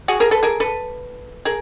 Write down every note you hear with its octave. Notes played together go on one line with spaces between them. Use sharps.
F#4 G#4
G#4 A#4
A4 B4
G#4 A#4
A4 B4
G#4 A#4